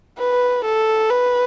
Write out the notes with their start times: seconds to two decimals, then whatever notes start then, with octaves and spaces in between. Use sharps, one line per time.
0.19 B4
0.65 A4
1.10 B4